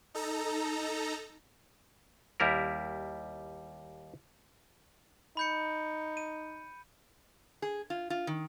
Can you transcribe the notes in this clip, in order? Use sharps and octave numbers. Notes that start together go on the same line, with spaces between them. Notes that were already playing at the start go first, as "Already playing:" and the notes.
D#4 A4 A#5
D#2 G3 E4 A#4
D#4 B5 G6 C#7
D#7
G#4
F4
F4
D#3